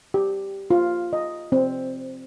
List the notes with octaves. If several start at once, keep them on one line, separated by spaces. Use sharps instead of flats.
G4
F4
D#5
C4